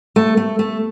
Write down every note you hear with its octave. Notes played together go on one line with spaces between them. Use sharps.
A3
A3
A3